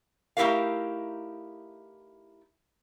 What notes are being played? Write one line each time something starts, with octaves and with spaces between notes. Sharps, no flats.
A3 D#4 E4 G4 A#4 F5